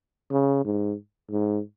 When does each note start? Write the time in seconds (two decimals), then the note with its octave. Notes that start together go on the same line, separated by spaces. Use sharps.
0.31 C#3
0.65 G#2
1.30 G#2